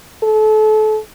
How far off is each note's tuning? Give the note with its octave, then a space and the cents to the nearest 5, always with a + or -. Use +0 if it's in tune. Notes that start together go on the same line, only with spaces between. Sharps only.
A4 -30